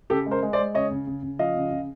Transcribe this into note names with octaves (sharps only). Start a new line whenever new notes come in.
C#3 G4 A4
G#3
A#4 C5
G#3
C5 D5
G#3
C#3 C#5 D#5
C#3
C#3
C#3
F3 D#5 F5
C#3
C#3